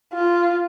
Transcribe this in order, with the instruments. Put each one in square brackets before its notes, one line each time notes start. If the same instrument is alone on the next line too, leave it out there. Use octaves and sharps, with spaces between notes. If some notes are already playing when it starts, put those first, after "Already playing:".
[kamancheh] F4